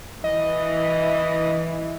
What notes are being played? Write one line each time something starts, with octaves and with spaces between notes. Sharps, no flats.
E3 D#5